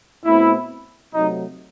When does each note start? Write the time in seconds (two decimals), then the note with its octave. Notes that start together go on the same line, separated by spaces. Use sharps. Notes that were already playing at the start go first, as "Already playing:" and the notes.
0.25 B2 A3 C4 E4
1.13 C3 F#3 A3 D#4